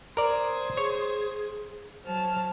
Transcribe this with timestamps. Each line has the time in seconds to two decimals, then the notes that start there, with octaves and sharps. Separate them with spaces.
0.17 A#4 C5 D5 D#6 G#6
0.77 G#4 C#5
2.05 F#3 C5 A5 F6